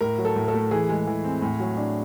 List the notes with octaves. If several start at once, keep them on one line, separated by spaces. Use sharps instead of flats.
A2 A#4
F#3
A4
A2
A4
A3
E3 G#4
G#3
E3
C4
A2
F#3
D4